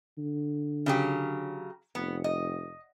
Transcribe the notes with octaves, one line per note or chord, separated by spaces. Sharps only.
D3
C#3 F#3 G4
F1 B3
D#5